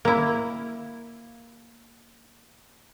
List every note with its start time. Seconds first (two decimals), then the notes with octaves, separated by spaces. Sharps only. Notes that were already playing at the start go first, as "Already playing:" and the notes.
0.05 A#3 E4